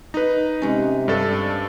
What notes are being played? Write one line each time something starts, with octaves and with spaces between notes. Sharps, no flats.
D#4 B4 D#5
C3 G#3 C#4
G2 D4 A4